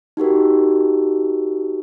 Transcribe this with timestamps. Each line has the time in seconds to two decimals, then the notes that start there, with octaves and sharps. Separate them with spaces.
0.17 D#4 F#4 G4 A#4